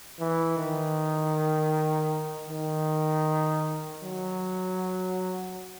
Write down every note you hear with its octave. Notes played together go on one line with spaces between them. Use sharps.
E3
D#3
D#3
F#3